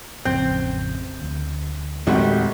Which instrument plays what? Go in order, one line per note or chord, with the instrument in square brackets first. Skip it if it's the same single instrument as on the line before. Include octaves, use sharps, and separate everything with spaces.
[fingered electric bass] A1 F2 C#3 [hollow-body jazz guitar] C4 [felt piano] G6
[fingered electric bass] D2
[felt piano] G#1 [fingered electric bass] E2 A#2 C4 [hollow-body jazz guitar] G3 A3 F#4